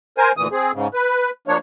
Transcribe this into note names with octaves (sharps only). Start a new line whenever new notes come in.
A#4 C5 G#5
D2 A#2 E3 D#6
C4 G#4
G#2 C#3
B4
F3 A#3 D4 C#5